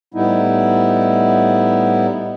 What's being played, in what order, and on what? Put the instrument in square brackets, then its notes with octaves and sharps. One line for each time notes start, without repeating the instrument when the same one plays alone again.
[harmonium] A2 G3 B3 D#4 E4